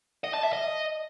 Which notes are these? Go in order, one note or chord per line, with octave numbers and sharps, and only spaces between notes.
D#5
A5
E5
D#5